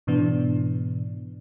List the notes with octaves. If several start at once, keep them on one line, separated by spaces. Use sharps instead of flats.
G#2 B2 E3 B3 D4